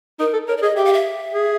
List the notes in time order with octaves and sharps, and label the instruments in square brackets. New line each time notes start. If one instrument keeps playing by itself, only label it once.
[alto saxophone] D#4 [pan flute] A#4
[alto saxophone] A4
[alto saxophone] A#4 [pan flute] C#5
[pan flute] D5
[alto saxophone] G#4 [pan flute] D#5
[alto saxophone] G4 [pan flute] E5
[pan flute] F5
E5
[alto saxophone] G#4